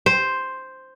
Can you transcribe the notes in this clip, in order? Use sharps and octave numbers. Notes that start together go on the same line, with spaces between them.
C5